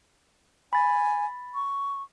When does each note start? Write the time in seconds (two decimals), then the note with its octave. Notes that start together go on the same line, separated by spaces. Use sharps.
0.73 G#5 B5 A6
1.54 C#6